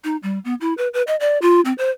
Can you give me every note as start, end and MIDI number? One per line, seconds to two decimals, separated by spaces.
0.04 0.17 63
0.23 0.39 55
0.45 0.55 59
0.61 0.74 64
0.78 0.88 71
0.94 1.02 71
1.07 1.16 75
1.20 1.38 74
1.42 1.61 65
1.65 1.73 60
1.78 1.91 72